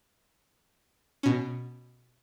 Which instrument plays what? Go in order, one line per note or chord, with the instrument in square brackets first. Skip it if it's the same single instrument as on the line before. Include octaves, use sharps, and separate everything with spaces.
[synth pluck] B2 C#4